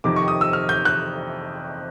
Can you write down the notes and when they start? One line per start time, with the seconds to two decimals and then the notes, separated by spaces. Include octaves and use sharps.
0.04 F2 C3 D#3 D6
0.16 C#6
0.28 D#6
0.41 E6
0.53 F6
0.69 G6
0.85 F#6